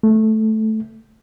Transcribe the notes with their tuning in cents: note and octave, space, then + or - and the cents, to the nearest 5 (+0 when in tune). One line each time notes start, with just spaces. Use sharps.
A3 -10